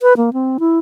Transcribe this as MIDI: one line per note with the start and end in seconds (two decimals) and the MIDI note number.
0.02 0.13 71
0.17 0.33 58
0.33 0.58 60
0.60 0.79 64